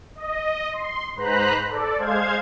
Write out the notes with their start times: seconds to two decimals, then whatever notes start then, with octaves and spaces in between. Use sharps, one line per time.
0.16 D#5
0.72 C6
1.16 G#2 B4 C5 A#5 B5 F#6
1.69 A4 D5
1.98 G#3 C5 F5 G#6